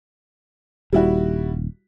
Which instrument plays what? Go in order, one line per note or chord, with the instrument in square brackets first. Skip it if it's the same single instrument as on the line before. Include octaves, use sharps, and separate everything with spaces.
[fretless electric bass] D#1 [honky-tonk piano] G3 E4 F#4